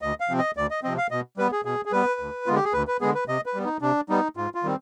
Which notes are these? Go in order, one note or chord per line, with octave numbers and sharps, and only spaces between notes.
D2 D#5
F5
C3 F3 C4
D#5
D2 D5
D#5
C3 F3 C4 D#5
F5
B2 D#5
G3 B3 B4
G#4
B2 G#4
G#4
G3 B3 B4
D2
D3 G#3 B3 F4
G4
G#4
D2 B4
B4
D3 G#3 B3 G#4
B4
C3 D#5
B4
G3 B3
D#4
C3 D4
G3 B3 D#4
G#2 F4
F4
D#3 G3 C4